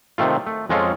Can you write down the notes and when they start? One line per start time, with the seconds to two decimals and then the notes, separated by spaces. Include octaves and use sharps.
0.18 C3 D#3 A3 F4
0.47 A3
0.69 F2 G#3 C#4 F4 A4